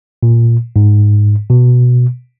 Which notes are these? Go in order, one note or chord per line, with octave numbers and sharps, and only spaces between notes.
A#2
G#2
B2